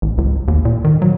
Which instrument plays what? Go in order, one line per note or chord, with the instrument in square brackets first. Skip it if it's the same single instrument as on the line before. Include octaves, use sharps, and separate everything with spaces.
[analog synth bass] A1
C#2
D#2
A#2
D#3
F#3